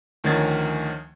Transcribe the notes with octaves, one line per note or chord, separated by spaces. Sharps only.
D2 D#3 F3 C#4 G#6 A6